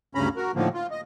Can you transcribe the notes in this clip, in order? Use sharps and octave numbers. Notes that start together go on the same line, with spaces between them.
D2 G2 C#3 C#4 A#5 B5
F#4 A#4
A2 D3 D#3 F3 A#3
F4
D#5